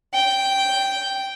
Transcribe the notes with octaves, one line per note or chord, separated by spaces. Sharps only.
G5